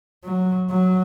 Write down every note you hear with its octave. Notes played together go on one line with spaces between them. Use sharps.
F#3
F#3